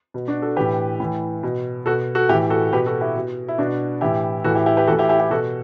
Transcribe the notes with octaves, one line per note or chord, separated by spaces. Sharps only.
B2
D4 F#4
F#4 A4
A2 E3 G4 B4
A2 E3
B2
B2 F#4 A4
F#4 A4
A2 E3 E4 G4
F#4 A4
B2 G4 B4
F#4 A4
E4 G4
B2
E4
B2 D4 F#4
A2 E3 E4 G4
A2 E3 F#4 A4
E4 G4
E4 G4
G4 B4
A2 E3 F#4 A4
E4 G4
E4 G4
E4 G4
B2 F#4 A4